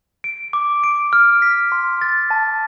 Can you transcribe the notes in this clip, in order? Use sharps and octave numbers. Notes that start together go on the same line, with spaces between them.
D7
D6
D7
F6
B6
C6
A6
A5